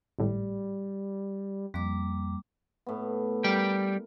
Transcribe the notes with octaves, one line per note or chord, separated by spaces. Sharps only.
G#1 A2 G3
F2 G3 A#3 D6
A2 B3
G3 A#4 G5